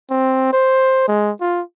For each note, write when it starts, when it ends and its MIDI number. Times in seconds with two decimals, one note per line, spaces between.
0.10 0.50 60
0.53 1.05 72
1.08 1.32 56
1.41 1.62 65